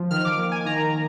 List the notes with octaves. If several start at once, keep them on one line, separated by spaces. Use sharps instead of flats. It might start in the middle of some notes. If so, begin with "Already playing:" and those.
Already playing: F3
D#3 F6
D6
A#3
G#5
D#3 A#5